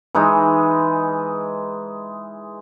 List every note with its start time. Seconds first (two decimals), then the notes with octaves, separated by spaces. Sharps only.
0.15 E3 G#3 D#4